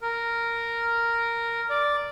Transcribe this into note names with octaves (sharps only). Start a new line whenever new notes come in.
A#4
D5